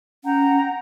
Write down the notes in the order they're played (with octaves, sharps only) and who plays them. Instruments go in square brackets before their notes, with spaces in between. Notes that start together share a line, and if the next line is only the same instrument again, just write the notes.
[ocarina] C#4 [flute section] F#5 G5 A#5